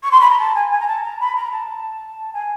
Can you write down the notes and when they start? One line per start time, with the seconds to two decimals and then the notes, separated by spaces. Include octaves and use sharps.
0.03 C#6
0.12 C6
0.21 B5
0.30 A#5
0.39 A5
0.55 G#5
0.71 G#5
0.80 A#5
0.87 A5
1.03 A#5
1.20 B5
1.36 A#5
1.52 A5
2.33 G#5